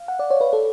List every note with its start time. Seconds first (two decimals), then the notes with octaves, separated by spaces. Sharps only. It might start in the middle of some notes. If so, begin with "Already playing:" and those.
Already playing: F5
0.08 F#5
0.19 D5
0.30 C#5
0.41 B4
0.53 A4